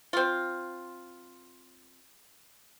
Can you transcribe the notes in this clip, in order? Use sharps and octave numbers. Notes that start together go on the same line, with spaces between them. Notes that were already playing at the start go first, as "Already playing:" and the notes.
C4 F4